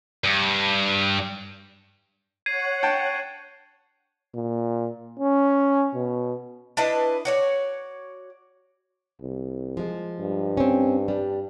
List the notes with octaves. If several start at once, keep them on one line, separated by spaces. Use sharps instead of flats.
G2
C#5 F#5 G#6 C7 D#7
G5 A5
A#2
C#4
B2
D4 E4 B4 D#5
F#4 C#5 D5
C2
F3 G#3
G2
C4 C#4
G3 D4